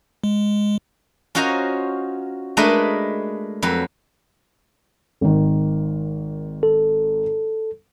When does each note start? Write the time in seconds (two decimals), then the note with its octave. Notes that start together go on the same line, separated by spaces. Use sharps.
0.24 G#3
1.35 C#4 F4 F#4 C5 D#5 A#5
2.57 G#3 A3 D4 A#4 B4 D#5
3.62 F2 F#3 B4
5.21 G#1 D#3
6.63 A4